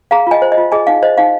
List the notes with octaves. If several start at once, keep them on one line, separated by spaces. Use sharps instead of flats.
G#4 F5 A#5
F4 D#5 G#5
C5
D#5
F4
G#4 D#5 G#5
D#4 F5
C5 D#5
D#4 F5